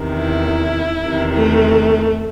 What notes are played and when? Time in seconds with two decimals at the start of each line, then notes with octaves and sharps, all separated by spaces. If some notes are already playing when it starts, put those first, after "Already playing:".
Already playing: E2 C3 D#3
0.19 E4
1.05 E2 C3 D#3
1.33 A3